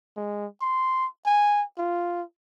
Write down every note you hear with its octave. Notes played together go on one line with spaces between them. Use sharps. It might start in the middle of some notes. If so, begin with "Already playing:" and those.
G#3
C6
G#5
F4